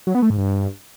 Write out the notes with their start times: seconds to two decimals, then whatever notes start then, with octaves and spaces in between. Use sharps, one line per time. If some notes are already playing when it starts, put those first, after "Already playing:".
0.07 F#3
0.15 B3
0.22 A3
0.30 G#2
0.38 G2